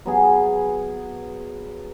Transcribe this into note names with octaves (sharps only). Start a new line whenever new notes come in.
F#3 B3 G#4